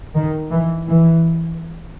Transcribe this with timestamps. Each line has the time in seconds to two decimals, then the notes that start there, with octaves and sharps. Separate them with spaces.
0.15 D#3
0.50 E3
0.87 E3